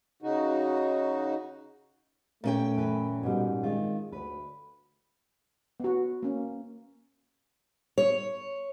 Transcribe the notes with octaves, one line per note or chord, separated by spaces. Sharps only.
C#3 D#4 F#4
A#2 A3 C#4 G5
F#2 E3 B4
G#2 B2 G3
D#3 G#3 C4 F4
D2 B4
B3 F#4
A#3 C#4
C#5